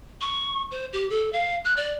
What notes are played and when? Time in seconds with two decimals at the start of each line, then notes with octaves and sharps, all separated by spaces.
0.21 C#6
0.71 C5
0.93 G4
1.10 A4
1.33 F5
1.65 F#6
1.77 D5